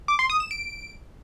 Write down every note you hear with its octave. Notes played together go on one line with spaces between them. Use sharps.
D6
C6
D#6
E7
D7